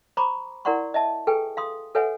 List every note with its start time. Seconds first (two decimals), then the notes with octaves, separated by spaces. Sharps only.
0.17 C5 A#5 B5 C#6 D6
0.65 E4 A#4 D5 F#5 C6 C#6
0.94 D#5 E5 A5
1.27 G#4 A4 B4 G5 G#5
1.57 F5 C6 D#6
1.95 A4 B4 C#5 E5 F#5 G#5